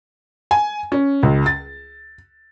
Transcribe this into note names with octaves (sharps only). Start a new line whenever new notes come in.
G#5
C#4
C#2
A6